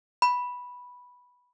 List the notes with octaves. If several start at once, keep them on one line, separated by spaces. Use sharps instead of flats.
B5